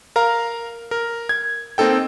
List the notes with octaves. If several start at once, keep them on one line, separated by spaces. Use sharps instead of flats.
A#4 F5 A#5
A#4
G#6
A#3 C4 D#4 A4 G5